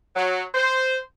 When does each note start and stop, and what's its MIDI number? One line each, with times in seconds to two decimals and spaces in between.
0.16 0.42 54
0.54 0.97 72